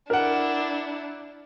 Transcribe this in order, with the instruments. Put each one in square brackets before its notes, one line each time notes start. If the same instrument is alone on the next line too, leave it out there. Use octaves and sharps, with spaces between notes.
[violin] D4 E4 [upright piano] A#4 F#5